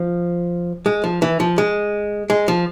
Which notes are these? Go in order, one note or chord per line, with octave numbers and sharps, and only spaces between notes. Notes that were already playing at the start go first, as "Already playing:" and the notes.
Already playing: F3
G#3
F3
E3
F3
G#3
G#3
F3